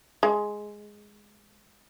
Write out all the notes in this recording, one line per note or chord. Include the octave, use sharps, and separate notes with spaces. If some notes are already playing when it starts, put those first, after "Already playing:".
G#3